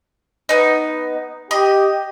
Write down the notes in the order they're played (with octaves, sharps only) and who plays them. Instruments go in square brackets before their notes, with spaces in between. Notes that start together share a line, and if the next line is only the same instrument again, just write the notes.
[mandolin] B3 D#4
[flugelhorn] G4 [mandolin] D#5